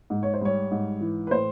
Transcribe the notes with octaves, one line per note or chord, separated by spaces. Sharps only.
G#2
C#5
C5
G3 C#5
G#2
E3
B4
A2 C5